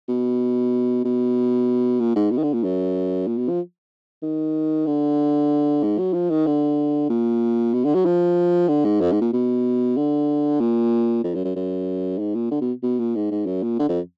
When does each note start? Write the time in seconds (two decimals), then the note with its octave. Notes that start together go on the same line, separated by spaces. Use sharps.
0.09 B2
1.05 B2
2.00 A#2
2.16 G#2
2.31 B2
2.38 D#3
2.43 D3
2.54 A#2
2.64 F#2
3.27 A#2
3.38 B2
3.49 F3
4.23 D#3
4.86 D3
5.83 G#2
5.99 F#3
6.14 F3
6.30 D#3
6.47 D3
7.10 A#2
7.74 B2
7.85 D3
7.95 F#3
8.06 F3
8.69 D3
8.85 G#2
9.01 F2
9.12 G#2
9.22 A#2
9.33 B2
9.97 D3
10.60 A#2
11.24 F2
11.35 F#2
11.45 F#2
11.56 F#2
12.19 G#2
12.35 A#2
12.51 D3
12.61 B2
12.83 B2
12.99 A#2
13.16 G#2
13.31 G#2
13.47 F#2
13.63 A#2
13.79 D3
13.89 F2